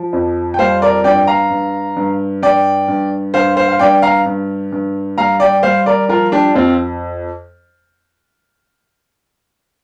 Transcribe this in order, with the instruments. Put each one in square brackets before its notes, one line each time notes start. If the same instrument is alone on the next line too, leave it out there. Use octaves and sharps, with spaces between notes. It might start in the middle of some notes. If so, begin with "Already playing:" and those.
Already playing: [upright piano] F3
F2
G5
G3 C5 F5
A#4 D5
G2 D5 G5
F5 A#5
G2
G2
G2 D5 G5
G2
G2 C5 F5
C5 F5
F5
G2 D5 G5
F5 A#5
G2
G2
G3 F5 A#5
D5 G5
G3 C5 F5
A#4 D5
F3 F4 A#4
D4 G4
F2 C4 F4